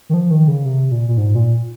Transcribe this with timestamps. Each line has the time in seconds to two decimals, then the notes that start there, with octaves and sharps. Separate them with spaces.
0.09 D#3
0.14 F3
0.31 D#3
0.48 C#3
0.65 C3
0.92 A#2
1.09 A#2
1.18 G#2
1.35 A#2